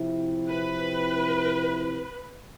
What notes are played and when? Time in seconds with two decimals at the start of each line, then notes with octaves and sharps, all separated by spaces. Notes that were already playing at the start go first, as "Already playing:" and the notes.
Already playing: C3 F3 C4 E4
0.49 B4